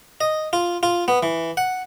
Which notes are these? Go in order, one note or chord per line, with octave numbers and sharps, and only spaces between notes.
D#5
F4
F4
B3
E3
F#5